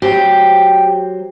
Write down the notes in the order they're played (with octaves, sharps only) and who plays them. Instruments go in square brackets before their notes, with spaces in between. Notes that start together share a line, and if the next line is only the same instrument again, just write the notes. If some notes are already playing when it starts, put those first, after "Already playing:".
[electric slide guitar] F#3 C5 G5 [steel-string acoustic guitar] G4